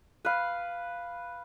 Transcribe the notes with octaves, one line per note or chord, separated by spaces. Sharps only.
B4 F5